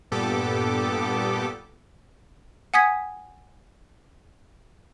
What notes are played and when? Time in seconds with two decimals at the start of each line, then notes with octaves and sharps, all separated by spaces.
0.11 G2 A#2 B3 G4 A4 D6
2.74 F#5 G#5 D#6 G#6 B6